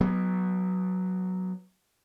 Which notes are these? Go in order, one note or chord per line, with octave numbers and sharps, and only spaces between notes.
F#3 B3